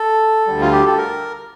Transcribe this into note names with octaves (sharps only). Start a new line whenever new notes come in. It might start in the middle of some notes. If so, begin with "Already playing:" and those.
Already playing: A4
D2 D3 G3
F4
G4
A4
A#4